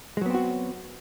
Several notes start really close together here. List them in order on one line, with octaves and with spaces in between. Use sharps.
G#3 F#3 B3 C4 F#4